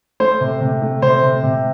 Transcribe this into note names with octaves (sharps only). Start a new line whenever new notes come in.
A3 C5
C3
C3
A3
C3 C5
C3
C3